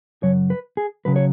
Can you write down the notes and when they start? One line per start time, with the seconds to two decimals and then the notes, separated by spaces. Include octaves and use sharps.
0.23 F#2 C#3 F#3 C#5
0.50 B4
0.77 G#4
1.05 C#3 F#3 B4
1.16 C#5